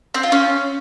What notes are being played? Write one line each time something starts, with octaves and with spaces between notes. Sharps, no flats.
C4
F4
C#4